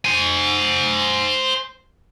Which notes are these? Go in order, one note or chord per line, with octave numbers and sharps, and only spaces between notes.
C5 G#5